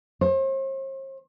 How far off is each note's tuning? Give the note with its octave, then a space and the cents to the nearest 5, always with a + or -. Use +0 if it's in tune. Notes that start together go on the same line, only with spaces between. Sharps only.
C5 +45